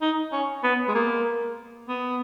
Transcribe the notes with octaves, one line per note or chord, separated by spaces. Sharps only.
D#4
C#4
B3
G#3
A#3
B3